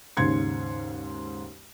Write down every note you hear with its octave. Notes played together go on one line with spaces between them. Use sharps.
D#2 G#2 C#3 C6 G#6 C#7